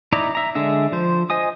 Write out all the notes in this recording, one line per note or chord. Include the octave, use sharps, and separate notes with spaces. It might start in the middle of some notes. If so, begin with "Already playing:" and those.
D#4 E4 D5 A#5
E5 A#5
D3 G#3 D4 E5
F3 C5
C5 D#5 G#5 D#6